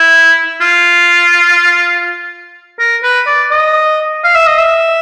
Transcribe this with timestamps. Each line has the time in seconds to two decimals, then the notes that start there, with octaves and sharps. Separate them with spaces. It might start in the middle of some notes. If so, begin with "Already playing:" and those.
Already playing: E4
0.61 F4
2.79 A#4
3.03 B4
3.27 D5
3.51 D#5
4.24 F5
4.35 E5
4.47 D#5
4.58 E5